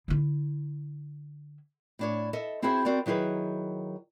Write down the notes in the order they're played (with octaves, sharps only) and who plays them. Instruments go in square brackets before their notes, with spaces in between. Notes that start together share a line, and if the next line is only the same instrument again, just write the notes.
[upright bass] D3 E4
[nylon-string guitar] A2 D4 C#5
A4 D#5 E5
C4 E4 F#4 G#4 C5 E5
C4 F#4 A#4 D5
D#3 F#3 E4 G#4 B4